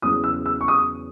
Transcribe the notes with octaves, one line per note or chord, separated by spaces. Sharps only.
E2 C#3 F#3 D#6
E6
E6
C#6
D#6